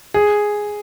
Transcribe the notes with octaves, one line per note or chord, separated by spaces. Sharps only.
G#4